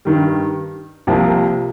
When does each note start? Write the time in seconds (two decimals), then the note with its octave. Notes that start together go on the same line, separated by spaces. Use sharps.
0.05 G2 D#3 G3
1.07 C2 C3 F3 A#3